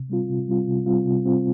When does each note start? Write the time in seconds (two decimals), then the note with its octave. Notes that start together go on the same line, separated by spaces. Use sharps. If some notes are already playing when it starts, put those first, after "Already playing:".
Already playing: C3
0.10 G3 C4 F4
0.29 C3
0.48 G3 C4 F4
0.67 C3
0.86 G3 C4 F4
1.05 C3
1.25 G3 C4 F4